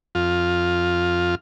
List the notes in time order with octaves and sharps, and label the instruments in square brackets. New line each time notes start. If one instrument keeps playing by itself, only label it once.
[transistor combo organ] F2 F4